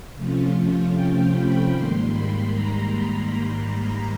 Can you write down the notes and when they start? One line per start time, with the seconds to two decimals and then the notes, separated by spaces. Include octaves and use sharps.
0.16 C3 F3 A3 C#4 F4
0.93 G5
1.31 B5
1.70 G#2 D#3 G3 A#3 C6
2.09 B5
2.47 A#5